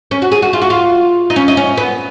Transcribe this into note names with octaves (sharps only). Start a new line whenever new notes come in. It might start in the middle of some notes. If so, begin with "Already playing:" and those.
C#4
F#4
G#4
F#4
F4
F#4
F4
D#4
C#4
D#4
C#4
B3